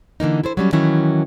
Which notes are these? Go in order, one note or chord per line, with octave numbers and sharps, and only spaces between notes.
D3 E3 A#3 D#4
E4 A4 C5
F#3 G3 C#4
D#3 E3 F#3 C#4 E4